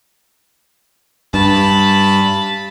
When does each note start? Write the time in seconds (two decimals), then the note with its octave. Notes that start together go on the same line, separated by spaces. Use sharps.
1.34 G2 A5 B5